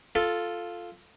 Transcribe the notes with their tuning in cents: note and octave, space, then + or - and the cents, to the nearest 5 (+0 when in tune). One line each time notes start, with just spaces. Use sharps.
F4 +0 A4 +0